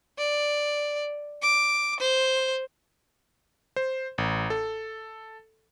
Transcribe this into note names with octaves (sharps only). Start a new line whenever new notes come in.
D5
D6
C5
C5
A1
A4